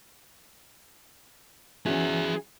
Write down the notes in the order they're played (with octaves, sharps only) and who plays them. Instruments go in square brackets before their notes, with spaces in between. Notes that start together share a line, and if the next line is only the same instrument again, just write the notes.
[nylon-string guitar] E3 C#4 F#4 [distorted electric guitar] G#4 E5